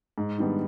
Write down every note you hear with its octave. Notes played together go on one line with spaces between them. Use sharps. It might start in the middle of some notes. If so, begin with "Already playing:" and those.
G#2
D#3 G3 B3 D4